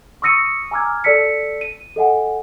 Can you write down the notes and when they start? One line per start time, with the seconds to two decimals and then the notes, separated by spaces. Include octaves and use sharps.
0.22 C#6 D#6 E6 A#6 C#7 D#7
0.71 G#5 A#5 D6 E6 F6 G#6
1.04 A4 D5 A5 E6 B6 C#7
1.61 D#7
1.96 A4 D#5 F#5 G#5